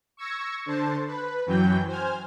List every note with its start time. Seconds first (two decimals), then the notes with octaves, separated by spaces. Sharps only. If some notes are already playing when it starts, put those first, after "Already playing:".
0.17 C#6 E6 G#6 A#6 C#7
0.66 D3 C5 A5
1.07 B4
1.46 F#2 E3 F#3 G5 G6
1.87 C5 G#5 F6